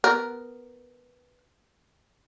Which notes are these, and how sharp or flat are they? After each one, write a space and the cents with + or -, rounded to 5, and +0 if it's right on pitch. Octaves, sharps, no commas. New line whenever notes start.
B3 +0 A#4 +0